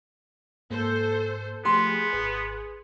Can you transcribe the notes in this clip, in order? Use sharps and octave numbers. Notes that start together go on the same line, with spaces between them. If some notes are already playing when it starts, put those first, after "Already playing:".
G#2 A#3 A4 C5
F3 A3 B3 G4 G#4 C6
G#1 B4